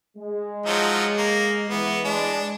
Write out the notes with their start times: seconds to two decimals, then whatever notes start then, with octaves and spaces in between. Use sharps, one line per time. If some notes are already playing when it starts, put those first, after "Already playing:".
0.17 G#3
0.66 F3 F#3 D#4
1.18 A#3
1.70 E3 B3
2.05 G#3 D4